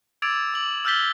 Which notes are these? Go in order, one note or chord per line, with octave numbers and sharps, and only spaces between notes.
D6 E6 G#6 A6 D7 F7
D6 F#7
E6 F6 G6 A6 B6 G7